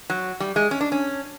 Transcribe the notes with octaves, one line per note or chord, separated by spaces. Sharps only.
F#3
G3
G#3
C#4
D4
C#4